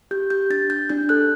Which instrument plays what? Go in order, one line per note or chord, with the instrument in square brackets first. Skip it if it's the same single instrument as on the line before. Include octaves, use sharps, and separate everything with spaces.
[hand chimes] G4 G6
G4 G6
D4 A6
D4 G6
D4 G6
A4 F#6